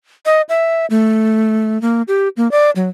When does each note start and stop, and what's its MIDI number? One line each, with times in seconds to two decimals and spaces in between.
0.26 0.42 75
0.49 0.86 76
0.90 1.80 57
1.82 2.02 58
2.08 2.28 67
2.37 2.50 58
2.51 2.70 74
2.76 2.89 54